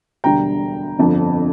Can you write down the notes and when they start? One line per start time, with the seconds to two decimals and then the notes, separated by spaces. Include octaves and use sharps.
0.24 E1 D2 D3 G3 G5 A#5
0.99 G1 F2 D3 F3